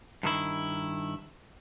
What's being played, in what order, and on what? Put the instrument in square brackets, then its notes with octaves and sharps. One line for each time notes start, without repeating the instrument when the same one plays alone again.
[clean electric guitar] G2 D#3 E4